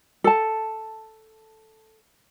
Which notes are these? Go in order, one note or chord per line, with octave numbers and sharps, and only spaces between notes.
A4 A5